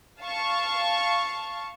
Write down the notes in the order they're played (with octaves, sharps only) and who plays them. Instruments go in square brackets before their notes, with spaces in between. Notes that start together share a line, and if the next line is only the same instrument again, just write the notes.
[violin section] F5 A5 C#6